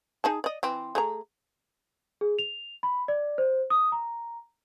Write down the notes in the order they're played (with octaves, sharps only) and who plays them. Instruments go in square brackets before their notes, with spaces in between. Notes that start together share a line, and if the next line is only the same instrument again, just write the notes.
[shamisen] D#4 G#4 A5
D5 D#5
E3 C4
A3 G#4 A#5
[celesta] G#4
F7
B5
D5
C5
D#6
A#5